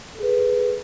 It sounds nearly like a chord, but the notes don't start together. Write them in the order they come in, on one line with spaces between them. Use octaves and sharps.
A4 G#4 B4